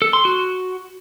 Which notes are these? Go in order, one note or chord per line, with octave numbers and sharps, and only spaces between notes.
A4
C6
F#4